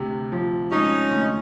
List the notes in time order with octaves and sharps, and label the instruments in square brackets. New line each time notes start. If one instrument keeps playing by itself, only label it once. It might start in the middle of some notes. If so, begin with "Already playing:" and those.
Already playing: [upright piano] D2 C3
F3
[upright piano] G#3 [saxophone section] C#4 D#4
[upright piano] D2